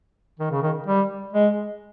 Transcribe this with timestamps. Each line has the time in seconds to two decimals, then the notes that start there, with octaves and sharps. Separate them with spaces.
0.39 D#3
0.51 C#3
0.62 D#3
0.87 G3
1.33 G#3